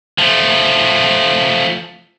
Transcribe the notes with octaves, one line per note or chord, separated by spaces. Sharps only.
F3 A3